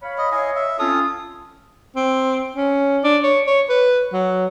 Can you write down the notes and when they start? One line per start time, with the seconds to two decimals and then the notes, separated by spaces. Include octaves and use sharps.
0.02 C#5 F5 B5
0.18 D#5
0.32 E4 C#5 D#5 F5 G#5
0.55 E5
0.79 C4 C#4 F4 A4 D#6
1.96 C4
2.56 C#4
3.04 D4
3.24 C#5
3.47 C#5
3.70 B4
4.13 F#3